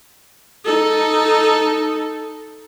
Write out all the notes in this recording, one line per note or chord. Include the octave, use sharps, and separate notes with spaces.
D#4 A4